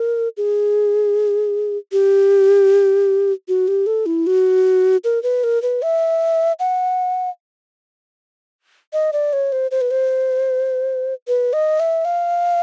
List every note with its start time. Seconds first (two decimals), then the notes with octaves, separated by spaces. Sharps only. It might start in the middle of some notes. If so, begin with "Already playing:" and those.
Already playing: A#4
0.37 G#4
1.92 G4
3.48 F#4
3.68 G4
3.87 A4
4.06 E4
4.27 F#4
5.04 A#4
5.23 B4
5.44 A#4
5.62 B4
5.82 E5
6.59 F#5
8.93 D#5
9.13 D5
9.33 C#5
9.52 C5
9.71 C5
9.81 B4
9.91 C5
11.28 B4
11.53 D#5
11.80 E5
12.05 F5